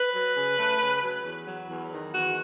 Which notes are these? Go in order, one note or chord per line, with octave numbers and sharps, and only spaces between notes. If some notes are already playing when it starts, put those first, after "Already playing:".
Already playing: B4
F#3
C#3
A3
C#3
F#3
E2
F#3
E2
D#3
E2 F#4